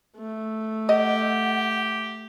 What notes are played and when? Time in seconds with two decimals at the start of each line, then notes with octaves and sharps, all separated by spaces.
0.17 A3
0.89 G4 D#5 F#5